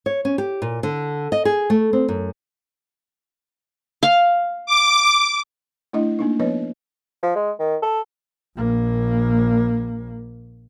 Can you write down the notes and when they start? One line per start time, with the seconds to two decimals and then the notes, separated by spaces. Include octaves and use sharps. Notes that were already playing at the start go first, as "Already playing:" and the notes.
0.06 C#5
0.25 C#4
0.38 G4
0.62 A#2
0.83 D3
1.32 D#5
1.45 G#4
1.70 A3
1.93 C4
2.08 F#2
4.03 F5
4.66 D6
5.93 A3 D4 E4 D#5
6.19 A#3 D4 D#4
6.40 F3 B3 B4 C#5 D#5
7.23 F3
7.35 G#3
7.59 D#3
7.82 A4
8.57 A#1 A#3